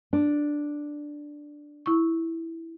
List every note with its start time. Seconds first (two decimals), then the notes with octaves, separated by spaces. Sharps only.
0.13 D4
1.86 E4 C#6